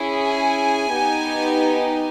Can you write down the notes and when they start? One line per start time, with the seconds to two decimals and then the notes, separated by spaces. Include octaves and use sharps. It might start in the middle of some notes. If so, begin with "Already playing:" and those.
Already playing: C#4 E4 G#4
0.21 G#5
0.93 B3 D#4 G4